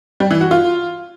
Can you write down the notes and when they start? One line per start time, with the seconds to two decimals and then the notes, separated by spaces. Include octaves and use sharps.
0.20 G3
0.31 E3
0.41 F#4
0.51 F4